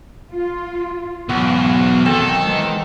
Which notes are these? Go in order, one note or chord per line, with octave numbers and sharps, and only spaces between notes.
F4
B1 E2 G#2 B3 F#4 F5
D#3 C4 A4
E3 G#3